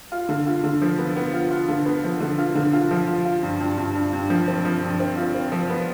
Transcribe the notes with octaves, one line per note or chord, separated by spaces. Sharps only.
F4
D3
F4
D3
F3
B3
B3
F4
F4
D3
B3
F3
D3
F4
D3
F4
F3
F4
F4
G2
G2
G2
G2
G2
F3
C4
F3
G2
C4
F4
C4
F3
B3